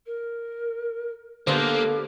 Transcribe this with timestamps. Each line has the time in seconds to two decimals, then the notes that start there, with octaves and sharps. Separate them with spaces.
0.06 A#4
1.47 D3 A#3 B3 G4 A4 B4 C5